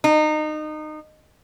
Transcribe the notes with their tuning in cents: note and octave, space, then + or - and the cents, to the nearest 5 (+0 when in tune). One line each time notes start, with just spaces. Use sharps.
D#4 -25